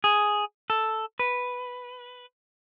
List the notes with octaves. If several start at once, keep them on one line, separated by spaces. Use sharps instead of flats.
G#4
A4
B4